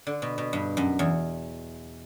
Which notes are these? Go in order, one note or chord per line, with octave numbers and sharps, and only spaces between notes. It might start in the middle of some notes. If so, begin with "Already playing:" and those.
D3
B2
B2
G2
F#2
E2